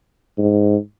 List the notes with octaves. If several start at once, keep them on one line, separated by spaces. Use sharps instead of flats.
G#2